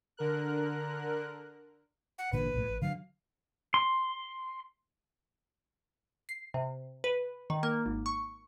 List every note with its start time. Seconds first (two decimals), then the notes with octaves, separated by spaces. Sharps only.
0.17 D3 A#4 F#6
2.18 F#5
2.33 A1 A#2 D3 B4
2.54 A#1 A2
2.67 A1
2.82 D3 F#3 F5
3.74 C6
6.29 C7
6.54 C3
7.04 B4
7.50 D#3
7.63 A#3
7.86 G#1
8.06 C#6